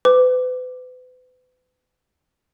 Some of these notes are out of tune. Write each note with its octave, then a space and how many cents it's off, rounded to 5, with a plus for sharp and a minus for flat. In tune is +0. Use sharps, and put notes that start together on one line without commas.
B4 +40 D6 +0